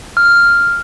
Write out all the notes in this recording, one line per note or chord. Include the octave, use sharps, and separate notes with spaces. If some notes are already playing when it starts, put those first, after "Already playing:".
F6